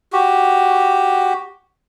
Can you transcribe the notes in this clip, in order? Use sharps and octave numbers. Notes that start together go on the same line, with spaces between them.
F#4 G4